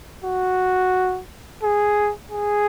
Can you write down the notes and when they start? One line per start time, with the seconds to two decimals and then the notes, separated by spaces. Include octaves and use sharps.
0.24 F#4
1.63 G#4
2.32 G#4